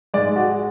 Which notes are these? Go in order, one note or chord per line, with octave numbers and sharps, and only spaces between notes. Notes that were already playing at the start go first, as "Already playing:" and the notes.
G#2 G#3 D5
F#4